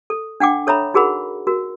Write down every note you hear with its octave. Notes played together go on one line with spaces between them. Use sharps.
A4
D4 F#5 G5 D6
A4 C#5 E5 A#5 B5
D#4 F#4 G#4 A#4 F#5 B5
F#4 A#4